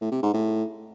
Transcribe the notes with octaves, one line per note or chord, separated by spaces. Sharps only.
A2
C3
G#2
A2